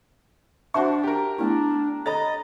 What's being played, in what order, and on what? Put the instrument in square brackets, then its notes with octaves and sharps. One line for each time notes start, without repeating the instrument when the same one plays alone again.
[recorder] D4 [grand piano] F#4 C5 C#6 [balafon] E5 A5
[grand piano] G4 A#4
[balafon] A3 B3 E4 [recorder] D4
[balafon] A4 C#5 B5 [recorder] D#5 [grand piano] A#5 A6